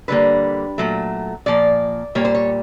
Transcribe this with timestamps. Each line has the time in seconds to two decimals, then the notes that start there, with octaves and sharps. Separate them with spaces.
0.08 D3 G3 A#3 B4
0.78 A#2 F#3 A3
1.46 A#2 F3 A#3 D5
2.15 A#2 G3 A#3 C#5
2.25 C5
2.35 C#5